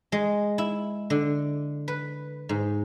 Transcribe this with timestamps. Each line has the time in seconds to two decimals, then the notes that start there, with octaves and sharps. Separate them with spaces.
0.12 G#3
0.58 E4
1.10 D3
1.88 B4
2.49 G#2